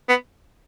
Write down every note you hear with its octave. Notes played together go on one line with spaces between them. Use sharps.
B3